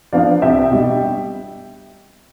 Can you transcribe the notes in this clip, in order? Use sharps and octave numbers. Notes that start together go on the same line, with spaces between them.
F3 B3 D4 D5 F5
C2 E5 G5
B2 G3 D4